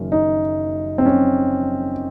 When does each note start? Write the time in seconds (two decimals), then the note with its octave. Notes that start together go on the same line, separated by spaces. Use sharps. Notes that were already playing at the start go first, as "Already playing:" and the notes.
Already playing: F#1 F#2 D#3 C#4
0.12 D#4
0.98 C4
1.06 C#4